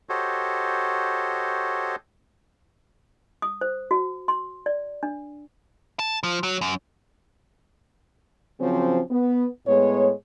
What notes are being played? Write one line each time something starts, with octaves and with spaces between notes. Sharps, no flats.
F#4 G4 A4 C5 C#5 D#5
D#6
C5
F#4
C6
D5
D4
A5
F3
F#3
F#2
C#3 F3 F#3 C4 C#4
B3
A2 G#3 B3 C#5